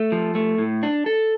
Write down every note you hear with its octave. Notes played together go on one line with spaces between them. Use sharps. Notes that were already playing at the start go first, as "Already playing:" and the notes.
Already playing: A3
F3
A3
A2
D4
A4